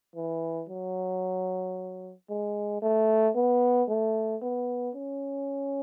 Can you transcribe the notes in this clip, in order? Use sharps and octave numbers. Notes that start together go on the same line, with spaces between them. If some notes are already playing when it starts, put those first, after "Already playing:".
E3
F#3
G#3
A3
B3
A3
B3
C#4